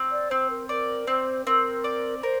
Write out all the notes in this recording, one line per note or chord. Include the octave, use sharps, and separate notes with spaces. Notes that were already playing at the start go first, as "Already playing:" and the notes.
Already playing: C4
D5
C4 C5
A#4
A#4 D5
C4 C5
C4 A#4
D5
A#4 C5